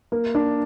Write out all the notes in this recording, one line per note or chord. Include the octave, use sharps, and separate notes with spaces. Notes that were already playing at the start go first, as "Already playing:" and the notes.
A#3
D4